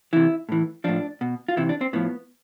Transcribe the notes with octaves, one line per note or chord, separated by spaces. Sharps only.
C3 E3 E4
A2 E3
A2 F3 D4
B2
F4
C3 E3 E4
D4
C4
A2 F3 B3